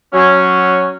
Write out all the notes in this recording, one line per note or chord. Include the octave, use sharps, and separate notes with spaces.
F#3 C#4